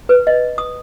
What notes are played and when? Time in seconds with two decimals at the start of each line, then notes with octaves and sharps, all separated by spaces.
0.09 B4
0.27 D#5
0.58 D#6